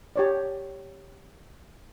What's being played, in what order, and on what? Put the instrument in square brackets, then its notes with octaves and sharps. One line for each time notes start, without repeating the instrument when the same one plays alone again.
[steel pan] G4 C#5 D5